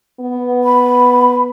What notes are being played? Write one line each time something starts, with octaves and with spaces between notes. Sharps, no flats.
B3
B5